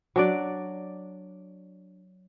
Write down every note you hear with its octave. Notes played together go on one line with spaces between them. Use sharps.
F#3 D4 D5